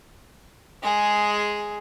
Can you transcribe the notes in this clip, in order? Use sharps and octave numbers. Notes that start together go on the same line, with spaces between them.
G#3 G#4